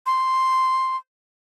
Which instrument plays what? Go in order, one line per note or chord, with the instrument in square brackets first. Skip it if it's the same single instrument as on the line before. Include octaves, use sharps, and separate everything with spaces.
[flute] C6